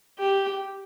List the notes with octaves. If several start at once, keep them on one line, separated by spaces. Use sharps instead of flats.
G4